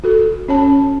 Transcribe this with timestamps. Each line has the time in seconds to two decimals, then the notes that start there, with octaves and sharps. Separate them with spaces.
0.04 F#4 A4
0.48 C#4 C#5 A5